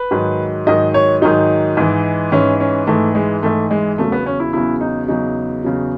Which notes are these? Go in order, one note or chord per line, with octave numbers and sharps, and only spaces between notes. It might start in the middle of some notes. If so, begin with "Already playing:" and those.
Already playing: B4
G#2 D#3 F#3
G#2 D#3 F#3 D#5
C#5
G#2 D#3 F#3 D#4
G#2 E3
G#2 E3 C#4
C#4
G#2 E3 A3
G#3
G#2 E3 A3
G#3
E2 C#3 F#3 A3
B3
C#4
E4
E2 C#3 F#3 E4
D#4
E2 C#3 F#3 D#4
E2 C#3 F#3